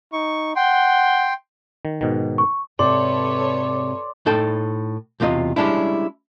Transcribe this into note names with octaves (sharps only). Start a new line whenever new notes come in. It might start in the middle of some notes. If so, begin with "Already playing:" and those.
D#4 C#6
F#5 G5 C6
D#3
G#2 B2 D#3
C#6
G#2 C3 A4 B4 C#5 D5 C6
A2 D#4 A4 C5 G5
B1 E2 C3 F4 D#5
G3 G#3 C#4 D4 E4